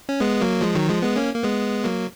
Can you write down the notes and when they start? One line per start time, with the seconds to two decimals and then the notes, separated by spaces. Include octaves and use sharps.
0.09 C#4
0.20 G#3 B3
0.41 F#3 A#3
0.61 F3 G#3
0.75 D#3 F#3
0.88 F3 G#3
1.02 G#3 B3
1.16 A#3 C#4
1.35 A#3
1.43 G#3 B3
1.84 F#3 A#3